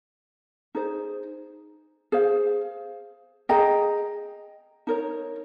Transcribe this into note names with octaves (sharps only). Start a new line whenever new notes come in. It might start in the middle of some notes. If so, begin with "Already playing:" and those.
D#4 G#4 C5
G#4 C5 F5
G#4 D#5 G5 A#5
D#4 A#4 C#5